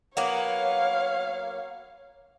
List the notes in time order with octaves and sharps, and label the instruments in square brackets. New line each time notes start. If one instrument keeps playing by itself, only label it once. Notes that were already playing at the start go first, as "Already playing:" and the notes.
[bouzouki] F#3 A#3 B3 [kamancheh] C#5 F5